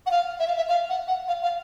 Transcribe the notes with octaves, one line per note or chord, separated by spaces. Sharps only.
F#5
F5
E5
F5
E5
F5
F#5
F#5
F5
F5